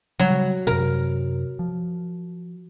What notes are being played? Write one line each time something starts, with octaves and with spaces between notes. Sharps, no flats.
C#3 F#3 G3
F#2 C3 A#4
F3